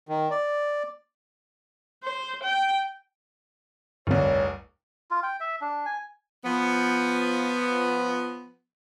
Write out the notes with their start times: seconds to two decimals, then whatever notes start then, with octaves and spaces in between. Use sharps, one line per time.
0.09 D#3
0.31 D5
2.03 C5
2.43 G5
4.07 F1 C2 G2 D3 C4 C#5
5.11 F4
5.23 G5
5.40 E5
5.61 D4
5.86 G#5
6.45 F3 B3